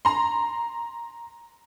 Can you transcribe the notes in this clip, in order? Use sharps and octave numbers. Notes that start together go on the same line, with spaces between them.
A#5 C6